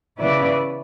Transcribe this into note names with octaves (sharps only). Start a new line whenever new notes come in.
C#3 E3 B3 E4 B4 D5